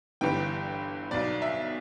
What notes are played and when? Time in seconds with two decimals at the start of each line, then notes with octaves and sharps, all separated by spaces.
0.21 G1 G2 E3 G5
1.11 B1 B2 D5
1.42 E5